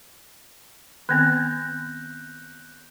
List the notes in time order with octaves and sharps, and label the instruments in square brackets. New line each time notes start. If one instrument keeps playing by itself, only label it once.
[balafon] D#3 B3 C4 [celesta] F#6 G6 A#6